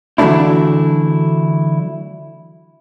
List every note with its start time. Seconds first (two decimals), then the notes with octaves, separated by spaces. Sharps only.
0.18 D3 E3 F#3 A3 D4 E4